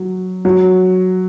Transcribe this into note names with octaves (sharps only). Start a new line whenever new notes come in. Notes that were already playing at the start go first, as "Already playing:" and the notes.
Already playing: F#3
F#3